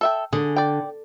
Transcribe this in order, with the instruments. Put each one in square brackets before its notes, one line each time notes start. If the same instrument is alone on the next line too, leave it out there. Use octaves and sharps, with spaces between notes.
[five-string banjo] A4 E5 G5
[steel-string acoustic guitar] D3 [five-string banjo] G#4
[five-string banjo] D5 G5